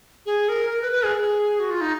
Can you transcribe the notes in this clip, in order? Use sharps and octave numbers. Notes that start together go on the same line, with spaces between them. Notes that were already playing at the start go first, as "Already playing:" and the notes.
G#4
A#4
A#4
B4
B4
G#4
F#4
F4
D#4